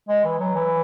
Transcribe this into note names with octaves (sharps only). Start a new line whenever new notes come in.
G#3
E3
F#3
E3